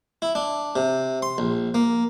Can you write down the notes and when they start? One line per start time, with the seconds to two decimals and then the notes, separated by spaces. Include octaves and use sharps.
0.22 E4
0.35 D4
0.76 C3
1.22 C6
1.38 A#1
1.74 A#3